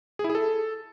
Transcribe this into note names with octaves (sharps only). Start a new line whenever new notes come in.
G#4
E4
G#4
A4